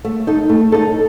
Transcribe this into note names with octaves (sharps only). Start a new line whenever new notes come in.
A3
D#4 A4
A3
D#4 A4